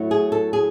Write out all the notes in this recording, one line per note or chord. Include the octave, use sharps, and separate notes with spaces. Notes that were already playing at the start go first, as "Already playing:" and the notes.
Already playing: A2 F#3 A3
G#4
A4
G#4